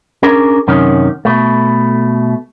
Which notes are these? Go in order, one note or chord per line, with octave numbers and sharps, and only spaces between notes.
C#4 D4 G#4 A#4
F#2 C3 D#3 C#4
B2 A3